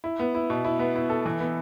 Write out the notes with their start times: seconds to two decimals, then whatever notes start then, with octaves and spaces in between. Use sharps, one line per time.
0.04 E4
0.20 B3
0.35 E4
0.50 B2
0.65 E4
0.79 B3
0.95 E4
1.10 A4
1.26 E3
1.40 B3